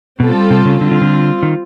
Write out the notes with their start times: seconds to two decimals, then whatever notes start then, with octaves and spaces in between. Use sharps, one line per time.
0.20 B2 G3 C4 F4 A4
0.51 C3
0.65 C#3
0.81 D3 G3 C4 F4
0.91 D3
1.02 D3
1.43 D#3